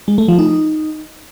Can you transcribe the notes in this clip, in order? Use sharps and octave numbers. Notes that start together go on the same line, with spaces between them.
G#3
A3
F3
D#4